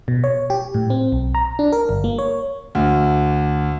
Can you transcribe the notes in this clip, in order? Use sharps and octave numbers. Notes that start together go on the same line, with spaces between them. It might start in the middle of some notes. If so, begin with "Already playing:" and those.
B2
C#5
G4
A2
C4
B1
A#5
D4
A#4
G1
A#3
C#5
D2